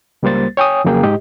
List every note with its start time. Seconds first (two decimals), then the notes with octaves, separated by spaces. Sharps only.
0.23 C#2 G3 A#3 C5 A6
0.57 C#5 G5 G#5 D#6
0.84 F2 C#3 F#3 A#3 G#4 G5
1.03 G#2 G4 D#5